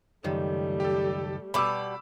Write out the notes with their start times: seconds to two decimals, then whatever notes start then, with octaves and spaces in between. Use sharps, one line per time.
0.24 C#2 F#2 D#3 G3 A3
0.80 G4 A4
1.54 B2 G3 B5 D6 E6